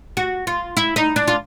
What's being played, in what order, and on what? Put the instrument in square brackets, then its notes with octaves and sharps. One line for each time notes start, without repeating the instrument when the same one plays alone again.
[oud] F#4
F4
E4
D#4
D4
F4